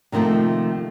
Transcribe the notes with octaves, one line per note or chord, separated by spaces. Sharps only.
C3 D#3 F3 A3 A#3